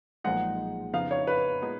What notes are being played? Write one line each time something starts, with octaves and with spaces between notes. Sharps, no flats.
B1 A#2 F3 G#3 D#4 F#5
F2 C#3 F3 B3 D#4 F5
C#5
B4
A#2 G#3 B3 D#4